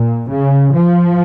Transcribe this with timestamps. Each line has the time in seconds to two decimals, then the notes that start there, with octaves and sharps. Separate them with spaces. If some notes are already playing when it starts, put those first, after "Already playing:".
Already playing: A#2
0.31 C#3
0.75 F3